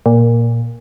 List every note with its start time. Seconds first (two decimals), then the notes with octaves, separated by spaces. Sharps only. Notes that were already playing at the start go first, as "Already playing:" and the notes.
0.06 A#2